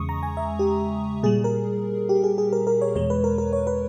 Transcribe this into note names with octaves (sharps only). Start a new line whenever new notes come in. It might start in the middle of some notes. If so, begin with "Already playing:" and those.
Already playing: E2 C#3 G#3 C#6 D#6
A#5
G#5
E5
G4
A#2 G3 G#4
A#4
G4
G#4
G#4
A#4
A#4
C#5
E2 B2 G#3 C#5
B4
A#4
A#4
C#5
B4